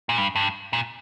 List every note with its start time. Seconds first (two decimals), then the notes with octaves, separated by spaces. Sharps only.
0.09 A#2
0.18 G2
0.35 G2
0.73 A#2